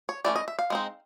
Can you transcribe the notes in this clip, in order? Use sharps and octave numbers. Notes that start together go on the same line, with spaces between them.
C#5
E3 A3 C#4 D5
D#5
E5
F5
G#3 C4 D#4